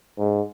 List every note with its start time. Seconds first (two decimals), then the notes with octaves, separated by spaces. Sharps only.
0.18 G#2